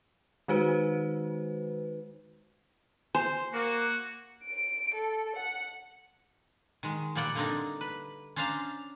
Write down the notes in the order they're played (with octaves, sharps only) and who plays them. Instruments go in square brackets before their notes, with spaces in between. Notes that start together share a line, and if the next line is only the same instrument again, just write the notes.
[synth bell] D#3 G#3 D#4 F#4 B4 C5
[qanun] C5 [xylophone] G#5
[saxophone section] A#3 [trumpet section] F#4
[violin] D7
A4
F#5
[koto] D#3 G#3
A#2 G3 A#3 D5 F#5 G5
D3 A#3 C4 D4 D#4
B4
C#4 D4 C5 F5 A5 A#5